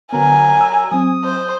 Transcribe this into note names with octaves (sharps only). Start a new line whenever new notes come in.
D3 F#3 B3 A#4 G#5
E6
F#3 C4 D#6
C5